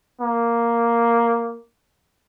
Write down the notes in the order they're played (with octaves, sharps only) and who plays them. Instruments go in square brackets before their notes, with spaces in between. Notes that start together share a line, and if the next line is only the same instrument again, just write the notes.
[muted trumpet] A#3